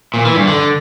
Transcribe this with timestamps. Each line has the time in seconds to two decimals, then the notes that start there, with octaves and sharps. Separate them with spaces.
0.14 A#2
0.25 E3
0.36 G2
0.47 D3